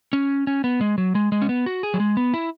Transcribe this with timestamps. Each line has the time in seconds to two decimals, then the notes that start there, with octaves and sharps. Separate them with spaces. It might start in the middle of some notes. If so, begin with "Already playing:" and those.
0.13 C#4
0.47 C#4
0.64 B3
0.81 G#3
0.98 F#3
1.15 G#3
1.32 G#3
1.42 C#4
1.49 B3
1.66 F#4
1.83 G#4
1.94 F#3
2.00 G#3
2.17 B3
2.34 E4